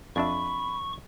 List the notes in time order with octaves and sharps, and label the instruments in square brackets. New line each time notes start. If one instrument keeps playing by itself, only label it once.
[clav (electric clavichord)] F2 D4 E5 [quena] B5 [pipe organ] C#6